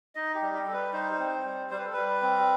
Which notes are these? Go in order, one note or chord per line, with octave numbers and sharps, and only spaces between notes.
D#4 D#5
G4
G3
G4
G3 A4
B4
D#4 C5
C4
G3
G3 C5
B4
A4
G3 B4
C4